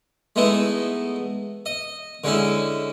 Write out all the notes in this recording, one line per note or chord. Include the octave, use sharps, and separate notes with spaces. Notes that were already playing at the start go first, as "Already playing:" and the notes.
G#3 A3 B3 D#4 E4
D#5
D3 G#3 C#4 E4